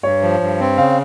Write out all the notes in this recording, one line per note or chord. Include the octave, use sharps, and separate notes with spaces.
G2 C#5
F3
G2
C4
C#3 F5